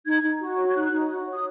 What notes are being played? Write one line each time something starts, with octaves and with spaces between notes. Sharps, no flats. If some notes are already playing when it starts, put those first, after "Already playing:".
D#4 G#6
D#4
F#4
C#5
G#6
D#4 F#6
D#4
F#4
C#5
D#6